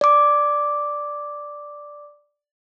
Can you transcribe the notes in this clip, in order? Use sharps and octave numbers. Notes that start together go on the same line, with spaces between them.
D5 D6